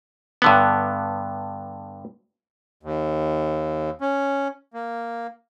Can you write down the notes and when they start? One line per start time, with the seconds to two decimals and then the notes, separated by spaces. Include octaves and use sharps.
0.42 G2 D3 B3
2.83 D#2
4.01 C#4
4.74 A#3